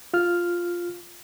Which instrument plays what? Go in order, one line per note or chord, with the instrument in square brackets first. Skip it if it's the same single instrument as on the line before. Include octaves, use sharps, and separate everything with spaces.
[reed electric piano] F4 F6